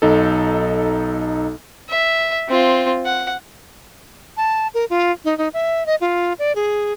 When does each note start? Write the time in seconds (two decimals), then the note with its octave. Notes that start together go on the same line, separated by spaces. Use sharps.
0.02 B1 D#4 A4
1.89 E5
2.48 C4 F4
3.05 F#5
4.37 A5
4.74 A#4
4.90 F4
5.25 D#4
5.38 D#4
5.54 E5
5.86 D#5
6.01 F4
6.39 D5
6.55 G#4